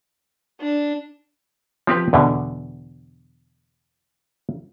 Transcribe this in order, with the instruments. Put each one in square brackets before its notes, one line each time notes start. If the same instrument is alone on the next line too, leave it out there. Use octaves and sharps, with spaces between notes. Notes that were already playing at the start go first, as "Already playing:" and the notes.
[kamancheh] D4
[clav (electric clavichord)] F3 C4 G4 B4
E2 B2 D3